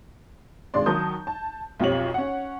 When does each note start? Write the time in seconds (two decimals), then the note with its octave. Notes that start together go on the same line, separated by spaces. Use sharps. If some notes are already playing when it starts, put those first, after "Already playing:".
0.74 G#1 G#3 D4 D5 C6
0.86 D#3 F#3 A5 D#6 G6
1.27 A5
1.80 B1 F2 C4 G4 C#5 F#7
2.14 C#4 F#5